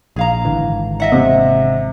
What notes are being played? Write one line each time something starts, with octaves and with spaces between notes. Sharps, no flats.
A#1 G#4 F5 A#5
G#1 D3 E3
D#5 E5 F#5
C3